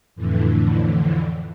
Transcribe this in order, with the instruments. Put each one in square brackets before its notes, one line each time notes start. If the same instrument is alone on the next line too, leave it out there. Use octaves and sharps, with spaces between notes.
[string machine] F2 A2 D3 E3